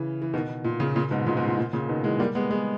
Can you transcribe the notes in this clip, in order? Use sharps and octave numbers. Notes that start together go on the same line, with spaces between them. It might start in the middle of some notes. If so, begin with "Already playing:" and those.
Already playing: C#3 E3
E3
B2 D#3
A#2
A#2 C#3
A#2 C#3
G#2 B2
A#2 C#3
G#2 B2
A#2
A#2
A#2 C#3
B2 D#3
E3 G#3
G3 A#3
G#3 B3
G#3 B3